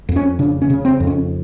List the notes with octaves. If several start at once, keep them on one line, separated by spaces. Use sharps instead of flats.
F2
C#4
C#3 D4
C#4
C#3
C4
F2
C#4